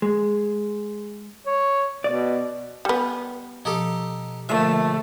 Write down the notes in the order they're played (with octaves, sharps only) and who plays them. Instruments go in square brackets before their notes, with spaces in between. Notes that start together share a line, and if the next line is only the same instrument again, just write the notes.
[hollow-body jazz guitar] G#3
[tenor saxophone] C#5
[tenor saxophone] B2 [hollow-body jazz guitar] D5
[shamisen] G3 B3 [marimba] G#5
[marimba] B2 F3 [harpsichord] D#4 G4 A4
[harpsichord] A#1 E5 [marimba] D3 [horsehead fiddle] A3